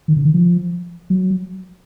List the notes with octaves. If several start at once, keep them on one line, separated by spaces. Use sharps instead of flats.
D#3
C#3
D#3
F3
F#3